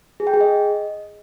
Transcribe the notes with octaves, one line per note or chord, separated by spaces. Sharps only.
G#4
G5
G#4
D#5